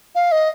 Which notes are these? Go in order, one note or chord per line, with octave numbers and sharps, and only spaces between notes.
F5
D#5